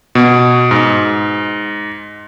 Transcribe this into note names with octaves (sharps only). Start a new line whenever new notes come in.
B2
G#2